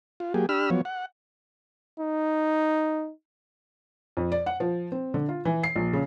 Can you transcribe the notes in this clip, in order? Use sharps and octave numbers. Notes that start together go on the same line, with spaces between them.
F4
F#3 A#3 G4 G#4
D4 G4 B5 E6 F6
F3 F#3 B3 C#5
F#5
D#4
F2
D5
F#5
F3
C4
D3
F4
E3
C7
A#1
C#3